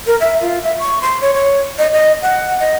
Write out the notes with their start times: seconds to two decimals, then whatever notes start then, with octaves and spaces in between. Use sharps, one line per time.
0.07 A#4
0.20 E5
0.42 F4
0.63 E5
0.79 C#6
1.02 C6
1.21 C#5
1.34 C#5
1.78 D#5
1.93 D#5
2.22 F#5
2.59 D#5